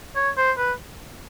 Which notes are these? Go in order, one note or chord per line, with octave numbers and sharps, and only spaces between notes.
C#5
C5
B4